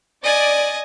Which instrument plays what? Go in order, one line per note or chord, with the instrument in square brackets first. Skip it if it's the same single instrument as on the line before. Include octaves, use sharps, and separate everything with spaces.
[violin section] D5 [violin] D#5 G#5